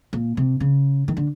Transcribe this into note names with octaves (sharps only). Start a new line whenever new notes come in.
A#2
C3
C#3
D#3
D3